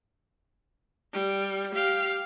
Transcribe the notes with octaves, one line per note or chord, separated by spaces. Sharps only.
G3
G4 F5